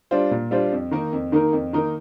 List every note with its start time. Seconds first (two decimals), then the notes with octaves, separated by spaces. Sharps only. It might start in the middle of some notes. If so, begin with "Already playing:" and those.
0.11 G3 D4 F4 C5
0.31 A#2
0.51 G3 D4 F4 C5
0.72 F2
0.91 D#3 A#3 D#4 A#4
1.13 F2
1.32 D#3 A#3 D#4 A#4
1.53 F2
1.73 D#3 A#3 D#4 A#4